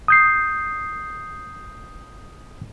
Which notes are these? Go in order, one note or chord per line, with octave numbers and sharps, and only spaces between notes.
D#6 G6 C7